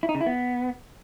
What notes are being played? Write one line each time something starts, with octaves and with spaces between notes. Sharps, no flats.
E4
D#4
C#3
E4
B3